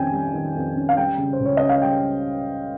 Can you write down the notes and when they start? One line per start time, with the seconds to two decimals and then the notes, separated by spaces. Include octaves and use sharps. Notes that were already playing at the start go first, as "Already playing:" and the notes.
Already playing: F2 D#3 G3 C#4 G5 G#5
0.13 G3
0.34 D#3
0.55 F2
0.76 C#4
0.89 F5
0.97 G3 G5
1.18 C#3
1.33 C5
1.40 C#2
1.45 C#5
1.57 C#4 D#5
1.69 F5
1.82 G3 G5